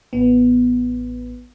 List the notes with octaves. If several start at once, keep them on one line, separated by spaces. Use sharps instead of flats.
A1 B3